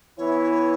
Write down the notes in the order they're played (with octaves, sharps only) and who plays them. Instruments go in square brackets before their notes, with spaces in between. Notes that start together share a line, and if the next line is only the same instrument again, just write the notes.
[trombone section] E3 B3 E4 [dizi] C#5